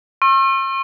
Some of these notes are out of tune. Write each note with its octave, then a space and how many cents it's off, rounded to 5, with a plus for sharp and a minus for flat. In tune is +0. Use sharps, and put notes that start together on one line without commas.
C#6 -45 E6 +35